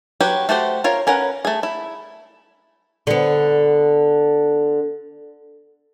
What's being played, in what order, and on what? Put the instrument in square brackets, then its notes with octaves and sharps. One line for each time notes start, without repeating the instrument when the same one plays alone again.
[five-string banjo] F#3 F#4 G4 B4
A3 F#4 G4 C5
F4 A#4 C#5
C#4 A#4 B4 F#5
A3 G#4
E4
[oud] D3 B3